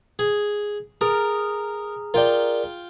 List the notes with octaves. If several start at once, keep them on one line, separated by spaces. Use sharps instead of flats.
G#4
G#4 A#4 A#5 F6
F4 A#4 D5 G5